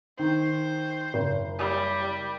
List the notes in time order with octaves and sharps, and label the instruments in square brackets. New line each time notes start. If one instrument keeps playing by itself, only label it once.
[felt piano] D#3 [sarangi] C5
[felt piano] F#1
[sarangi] G3